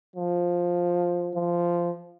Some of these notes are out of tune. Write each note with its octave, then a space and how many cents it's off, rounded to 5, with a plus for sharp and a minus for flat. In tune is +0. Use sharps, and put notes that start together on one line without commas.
F3 +10
F3 -10